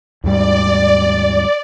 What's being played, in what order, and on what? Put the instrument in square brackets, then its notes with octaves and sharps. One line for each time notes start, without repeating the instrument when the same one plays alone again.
[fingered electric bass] D#2 G#2 G3 [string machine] D5